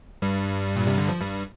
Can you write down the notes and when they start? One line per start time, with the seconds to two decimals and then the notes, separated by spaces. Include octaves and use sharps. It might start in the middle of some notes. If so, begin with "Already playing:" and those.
0.22 G2 G3
0.76 A#2
0.87 C3
0.98 D3
1.09 F3
1.21 G2 G3